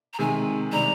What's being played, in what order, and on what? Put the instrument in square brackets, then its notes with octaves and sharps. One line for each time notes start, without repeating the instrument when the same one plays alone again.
[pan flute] A#5
[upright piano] C3 D#3 G#3 [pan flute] G#5
[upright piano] C3 D#3 G3 D4 [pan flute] A#5